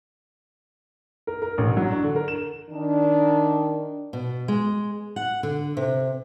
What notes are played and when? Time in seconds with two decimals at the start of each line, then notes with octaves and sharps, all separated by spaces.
1.27 A#4
1.42 A#4
1.58 A1
1.77 F#3
1.91 D4
2.03 D3
2.16 A#4
2.28 E7
2.70 D#3 D4
4.13 B2
4.48 G#3
5.16 F#5
5.43 D3
5.77 C3